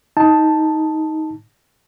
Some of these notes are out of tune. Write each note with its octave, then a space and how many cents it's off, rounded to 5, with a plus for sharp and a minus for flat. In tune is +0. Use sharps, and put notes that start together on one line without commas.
D#4 +15 A5 +0